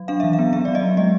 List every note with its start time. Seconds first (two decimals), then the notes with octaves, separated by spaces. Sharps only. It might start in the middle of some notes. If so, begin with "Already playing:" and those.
Already playing: F#3
0.08 D4 F5
0.20 E3 E5
0.33 F5
0.39 B3
0.53 B3 E5
0.65 F#3 D5
0.75 D#5
0.83 B3
0.97 G#3 D#5